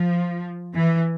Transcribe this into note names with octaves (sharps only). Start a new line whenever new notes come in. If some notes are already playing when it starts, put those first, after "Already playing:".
Already playing: F3
E3